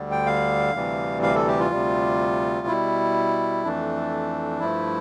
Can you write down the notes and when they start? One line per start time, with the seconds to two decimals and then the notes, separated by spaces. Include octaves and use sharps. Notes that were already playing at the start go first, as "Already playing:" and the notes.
Already playing: D2 D3 G3
0.11 G5
0.26 F5
0.75 D2 C3 E3 G3
1.23 F5
1.35 A4
1.48 G4
1.59 F4
1.71 D2 C3 G3
2.67 B2 G3 E4
3.64 F2 E3 A3 D4
4.60 G2 F3 A3 E4